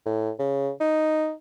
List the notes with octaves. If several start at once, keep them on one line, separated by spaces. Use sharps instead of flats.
A2
C#3
D#4